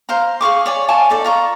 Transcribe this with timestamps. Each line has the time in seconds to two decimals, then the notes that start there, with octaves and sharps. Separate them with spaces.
0.09 C5 F5 A#5
0.41 G#4 F5 C#6 D6
0.66 C#5 D5 G#5
0.88 F4 G#5 A5 C#6
1.10 D#4 A4 D5
1.24 F4 A#5 C#6